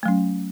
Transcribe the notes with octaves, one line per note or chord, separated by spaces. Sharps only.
F#3 A3 C#4